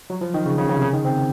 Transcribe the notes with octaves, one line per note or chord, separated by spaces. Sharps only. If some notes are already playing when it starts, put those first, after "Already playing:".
F#3
F3
D#3
C#3
C#3
C#3
C3
C#3
D#3
C4